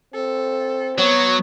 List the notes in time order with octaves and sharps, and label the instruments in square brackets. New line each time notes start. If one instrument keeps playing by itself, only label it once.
[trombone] C4 [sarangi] A4
[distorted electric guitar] F#3 [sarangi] B3 [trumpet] C#5